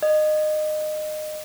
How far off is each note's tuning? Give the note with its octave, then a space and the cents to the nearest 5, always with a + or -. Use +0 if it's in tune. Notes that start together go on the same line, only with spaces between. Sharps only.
D#5 -25